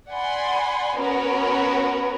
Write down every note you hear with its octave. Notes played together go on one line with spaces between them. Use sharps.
D5 F#5 G#5 B5 C6
B3 C#4 F#4 A#4 B4